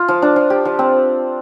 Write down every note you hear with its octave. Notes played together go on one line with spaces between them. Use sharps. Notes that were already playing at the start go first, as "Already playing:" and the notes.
Already playing: F4
F3
D4
F3
G4
F3
C4